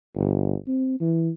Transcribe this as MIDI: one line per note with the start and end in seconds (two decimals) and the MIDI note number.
0.16 0.55 31
0.68 0.99 60
1.00 1.30 52